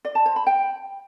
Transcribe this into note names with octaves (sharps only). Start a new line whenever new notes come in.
D5
A5
C5
B5
G5